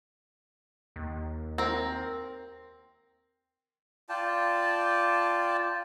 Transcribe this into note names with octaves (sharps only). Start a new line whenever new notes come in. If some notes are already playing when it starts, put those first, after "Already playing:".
D#2
C4 A#4
F4 D5 G5 A5